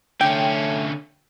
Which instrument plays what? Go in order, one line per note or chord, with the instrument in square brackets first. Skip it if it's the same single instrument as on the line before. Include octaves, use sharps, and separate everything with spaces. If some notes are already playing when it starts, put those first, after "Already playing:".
[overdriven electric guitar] D3 C#4 [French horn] A3 [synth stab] G5